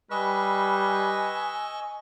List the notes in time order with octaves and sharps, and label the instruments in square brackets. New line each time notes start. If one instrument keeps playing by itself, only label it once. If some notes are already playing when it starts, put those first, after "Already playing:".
[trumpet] G3 [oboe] B4 [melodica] D#5 C#6 E6 [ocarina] G#5